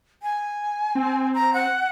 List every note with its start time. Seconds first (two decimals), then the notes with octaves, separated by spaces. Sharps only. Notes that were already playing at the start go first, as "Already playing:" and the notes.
0.23 G#5
0.95 C4
1.34 A#5
1.53 F#5